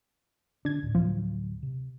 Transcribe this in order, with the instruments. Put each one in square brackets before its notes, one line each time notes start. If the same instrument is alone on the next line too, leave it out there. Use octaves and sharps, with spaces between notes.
[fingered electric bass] D3 [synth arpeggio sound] D4 G#6
[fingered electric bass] D2 A2
[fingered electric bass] D2 A2 F#3 [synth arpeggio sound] F3
[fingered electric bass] C3